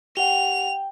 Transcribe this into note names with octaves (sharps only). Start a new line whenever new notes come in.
G4 F#5 G5 F7